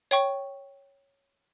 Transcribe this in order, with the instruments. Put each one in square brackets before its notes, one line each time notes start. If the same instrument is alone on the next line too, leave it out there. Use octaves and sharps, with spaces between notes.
[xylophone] C#5 G5 C#6